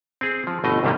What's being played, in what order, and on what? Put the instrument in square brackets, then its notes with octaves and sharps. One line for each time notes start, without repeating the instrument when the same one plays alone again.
[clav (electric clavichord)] C4 G#4
F3
G1 B2 A3 D#5
C2 G#2 C3 D#3 G3 A#3